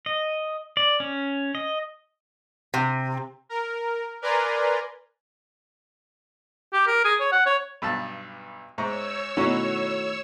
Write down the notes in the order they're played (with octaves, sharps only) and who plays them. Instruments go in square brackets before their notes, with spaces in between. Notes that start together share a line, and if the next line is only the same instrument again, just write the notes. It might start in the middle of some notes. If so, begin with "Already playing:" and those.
[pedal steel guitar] D#5
D5
C#4
D#5
[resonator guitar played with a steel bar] C3
[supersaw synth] A#4
A#4 B4 D5 G#5 A#5 C6
[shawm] G4
A#4
G#4
C#5
F#5
C#5
[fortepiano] B1 G2 A5 [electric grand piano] B5 E6
[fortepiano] G#2 [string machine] C#5 E6 [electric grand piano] E5 A#5 C#6
[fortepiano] B2 C#4 [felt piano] D#3 A3 E4 [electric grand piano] F#4 A#5 C#6